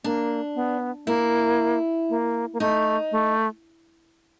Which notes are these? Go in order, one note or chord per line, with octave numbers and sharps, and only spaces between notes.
A#3 D4
B3
A#3 E4
A#3
A#3
A3 D#4
A3